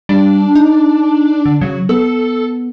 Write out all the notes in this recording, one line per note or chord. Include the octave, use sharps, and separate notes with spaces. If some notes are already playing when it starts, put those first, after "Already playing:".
G3 D4
D#4
D3
C#3 F#3
B3 A4